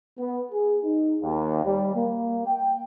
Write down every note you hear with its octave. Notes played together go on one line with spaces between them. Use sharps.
B3
G#4
D#4
D#2
G3
A#3
G5